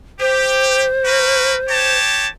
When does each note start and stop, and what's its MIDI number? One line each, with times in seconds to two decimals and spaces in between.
0.20 0.85 67
0.20 1.97 72
1.05 1.54 66
1.05 1.54 70
1.05 1.54 71
1.69 2.27 67
1.69 2.27 73
1.69 2.27 81